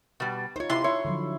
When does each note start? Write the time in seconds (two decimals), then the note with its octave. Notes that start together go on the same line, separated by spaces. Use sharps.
0.20 B2 G3
0.56 D#4 F4 C5 C#5
0.70 C3 E4 C6
0.84 E4 C#5
1.05 D3 F3 F#3